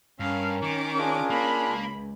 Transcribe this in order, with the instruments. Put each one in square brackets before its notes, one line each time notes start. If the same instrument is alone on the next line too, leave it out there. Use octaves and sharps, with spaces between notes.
[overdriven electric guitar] G2 [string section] C#4 A#4 [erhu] F5
[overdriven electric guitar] D#3 [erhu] D6
[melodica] D4 F4 G#4
[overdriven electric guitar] A#3 [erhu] B5
[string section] C#2